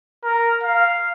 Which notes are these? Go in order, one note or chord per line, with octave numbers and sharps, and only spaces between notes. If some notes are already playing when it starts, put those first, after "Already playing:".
A#4
F5